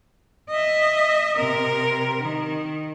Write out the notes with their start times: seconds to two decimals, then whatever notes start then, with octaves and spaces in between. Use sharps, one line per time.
0.50 D#5 E5
1.36 C3 A#4
2.20 D#3